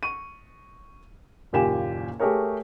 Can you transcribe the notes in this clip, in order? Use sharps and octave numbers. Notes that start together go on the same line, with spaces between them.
C#6 D#7
F#1 D#2 A#2 G4 G#5 E7
A3 G4 G#4 A#4 C#5